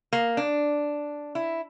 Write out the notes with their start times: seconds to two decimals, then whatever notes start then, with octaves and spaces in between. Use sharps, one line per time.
0.13 A#3
0.37 D4
1.35 E4